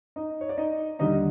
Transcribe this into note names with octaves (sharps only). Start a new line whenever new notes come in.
D#4 D#5
C#5
D5
D#4 D#5
D#2 D3 G3 D#4 D#5